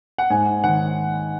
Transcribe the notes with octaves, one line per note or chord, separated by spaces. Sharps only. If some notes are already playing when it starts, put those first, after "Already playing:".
F#5
G#2 G#5
D#3 F#5